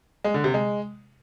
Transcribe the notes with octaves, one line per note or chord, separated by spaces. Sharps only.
G#3
D3
C3
G#3